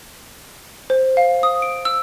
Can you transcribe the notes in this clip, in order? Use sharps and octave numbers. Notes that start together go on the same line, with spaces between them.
C5
F5
D#6
D7
E6